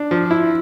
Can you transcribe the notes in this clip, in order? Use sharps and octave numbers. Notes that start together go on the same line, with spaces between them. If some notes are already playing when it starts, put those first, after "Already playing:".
Already playing: D4
F3
E4